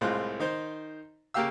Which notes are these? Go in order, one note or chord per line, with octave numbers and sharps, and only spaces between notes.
C2 A2 G#3 C4 F4 F#6
D#3 D#4 C5
C#3 A#3 G4 F5 E6